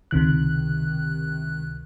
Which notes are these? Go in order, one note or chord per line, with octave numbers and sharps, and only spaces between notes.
C#2 C3 D#3 F#6